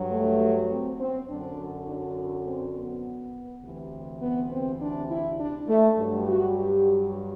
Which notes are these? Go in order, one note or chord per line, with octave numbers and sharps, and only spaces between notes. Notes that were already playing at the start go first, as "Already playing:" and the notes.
Already playing: G2 F#3
A3
C4
C4
F#2 D3 F#3 D4
D4
C4
B3
D2 C3 E3
B3
C4
D4
E4
D4
A3
G2 F#3
F#4
G4